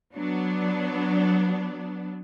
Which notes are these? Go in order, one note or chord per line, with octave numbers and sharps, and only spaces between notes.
F#3 B3 D4